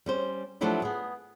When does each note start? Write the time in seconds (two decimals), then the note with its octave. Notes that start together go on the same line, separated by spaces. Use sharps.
0.06 G3 C#4 C5
0.61 F3 F#3 A3 D4 E4 G4
0.82 B3 G#4